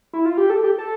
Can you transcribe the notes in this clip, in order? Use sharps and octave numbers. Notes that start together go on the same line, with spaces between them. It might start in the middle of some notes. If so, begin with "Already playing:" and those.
E4
F4
G4
A4
G4
A4